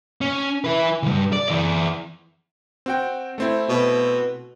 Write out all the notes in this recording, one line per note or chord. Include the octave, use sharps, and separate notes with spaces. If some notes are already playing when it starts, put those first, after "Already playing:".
C#4
E4 B4
D2 G2
D5
E3 D5
C4 F#4 G5
A3 C4 E4
B2